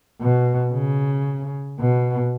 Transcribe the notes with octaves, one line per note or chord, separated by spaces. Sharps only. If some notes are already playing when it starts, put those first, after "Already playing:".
B2
C#3
B2